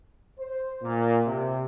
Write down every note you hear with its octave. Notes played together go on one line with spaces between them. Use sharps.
C5
A#2
C3